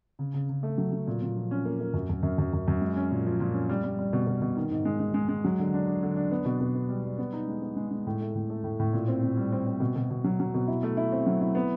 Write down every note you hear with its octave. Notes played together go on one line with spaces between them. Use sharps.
C#3
C#3
C#3
A3
F#3
F#3
A#2
A#2
F3
C#4
A#3
A#3
F#2
F#2
F#2
F#2
F#2
F#2
G#3
C#4
A#2
F3
A#2
C#4
G3
G3
G3
B2
B2
B2
D#3
G#2
G#3
G#3
G#3
G#3
F#3
D3
D4
D4
D3
D4
B3
B2
B2
B3
G3
G3
B3
D#4
G#3
B3
G#3
G#3
A2
A3
A2
A3
A2
A2
A#2
C4
A#2
G3
C4
C4
B2
B2
B2
F#3
F#3
B2
E4
A3
E4
C4
F#3
E4
B3